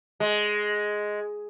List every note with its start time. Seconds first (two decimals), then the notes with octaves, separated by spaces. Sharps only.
0.20 G#3